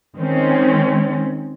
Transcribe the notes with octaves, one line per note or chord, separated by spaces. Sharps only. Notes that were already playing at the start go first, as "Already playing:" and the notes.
D#3 G#3 C4 C#4